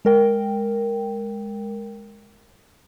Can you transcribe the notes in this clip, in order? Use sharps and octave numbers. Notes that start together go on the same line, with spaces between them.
G#3 A#4 G5